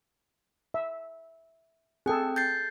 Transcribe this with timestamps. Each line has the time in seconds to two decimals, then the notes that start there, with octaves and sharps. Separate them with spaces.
0.74 E5
2.06 C4 G#4 A4 G5
2.36 G6 A6 C7